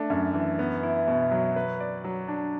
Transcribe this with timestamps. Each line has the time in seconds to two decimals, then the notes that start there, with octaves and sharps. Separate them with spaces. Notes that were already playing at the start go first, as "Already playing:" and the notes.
Already playing: A3 D4
0.10 F#2
0.34 E3
0.59 B3
0.83 E4
1.08 B2
1.31 F#3
1.56 B4
1.80 D5
2.04 F#3
2.28 D4